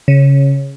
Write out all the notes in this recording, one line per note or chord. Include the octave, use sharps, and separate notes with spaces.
C#3